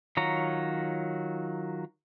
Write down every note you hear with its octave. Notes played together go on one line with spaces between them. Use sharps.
D#3 F#3 F4 C#5 A#5